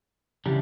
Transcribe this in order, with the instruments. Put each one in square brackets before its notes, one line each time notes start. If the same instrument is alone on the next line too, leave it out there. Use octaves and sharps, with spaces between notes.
[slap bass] C#3 [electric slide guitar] E3 G3 D4 G4